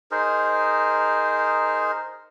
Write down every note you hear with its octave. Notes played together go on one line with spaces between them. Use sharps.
D#4 G#4 A#4 C5